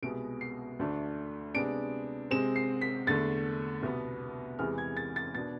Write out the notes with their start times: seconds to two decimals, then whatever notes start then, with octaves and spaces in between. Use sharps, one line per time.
0.03 C2 B2 G#3 B3 D7
0.41 C7
0.79 D2 D3 A3 D4
1.54 C3 G#3 B3 D4 D7
2.31 C3 G#3 C4 E7
2.56 C7
2.81 B6
3.07 E2 D3 A3 A6
3.83 C2 B2 B3
4.59 E2 C3 E3 G#3 F6
4.78 G#6
4.97 A6
5.16 A6
5.34 B2 B3 D4 A6